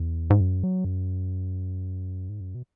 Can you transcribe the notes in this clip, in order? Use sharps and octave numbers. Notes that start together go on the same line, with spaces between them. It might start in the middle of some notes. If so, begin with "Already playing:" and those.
Already playing: E2
G#2
F#2
F#3
F#2
G#2
F#2
B2